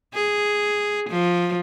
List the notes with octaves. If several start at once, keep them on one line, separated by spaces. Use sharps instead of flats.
G#4
F3